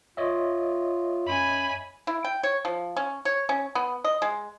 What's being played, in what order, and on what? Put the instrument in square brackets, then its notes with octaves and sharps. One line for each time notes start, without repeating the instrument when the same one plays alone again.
[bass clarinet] F4 [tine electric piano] C#5 D#5 E5
[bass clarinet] F#2 [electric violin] G#5 B5
[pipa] E4
G5
C#5
F3
C#4
C#5
C#4
B3
D#5
G#3